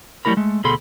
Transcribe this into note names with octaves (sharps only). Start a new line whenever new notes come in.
F#3 G3 A3 E4 A#4 B5
G#3 A3
D2 B2 G#4 A4 B5 C6